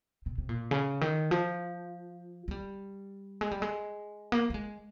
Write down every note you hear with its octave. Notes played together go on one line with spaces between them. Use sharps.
C3
C3
A#2
C#3
D#3
F3
G#3
G3
G#3
G3
G#3
A#3
A#3
G#3